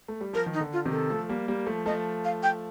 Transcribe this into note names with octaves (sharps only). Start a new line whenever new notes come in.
A3
G3
F3 A#4
D#3
D#4
D3
F4
C3 D#3
A4
F3 A3
G3 A#3
G3 A#3
F3 A3
F3 A3 D#5
F5
G5